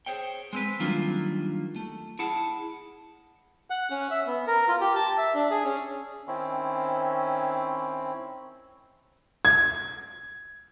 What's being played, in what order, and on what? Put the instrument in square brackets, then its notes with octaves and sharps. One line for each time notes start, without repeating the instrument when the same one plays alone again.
[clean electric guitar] G#4 C5 C#5 G5
G#3 C4 B4
D#3 F#3 G3 A#3 D4 F4
A3
E4 G#4 F#5 A5
[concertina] F#5
C#4
E5
B3
A#4
F4
G4
A5
E5
D4
G#4
C#4
[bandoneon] D#3 C4 C#4 E4
[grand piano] G#6